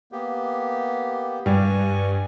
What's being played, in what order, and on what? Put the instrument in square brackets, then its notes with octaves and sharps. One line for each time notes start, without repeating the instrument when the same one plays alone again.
[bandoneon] A#3 B3 G4
[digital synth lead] G2 [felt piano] G3 [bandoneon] G#5 C#6